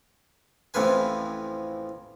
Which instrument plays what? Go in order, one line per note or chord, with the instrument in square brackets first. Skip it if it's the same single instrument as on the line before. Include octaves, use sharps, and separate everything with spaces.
[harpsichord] A1 F2 A2 F3 B4 G#5